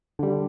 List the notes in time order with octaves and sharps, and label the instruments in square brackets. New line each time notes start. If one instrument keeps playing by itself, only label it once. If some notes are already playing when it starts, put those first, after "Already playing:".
[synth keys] D3 G3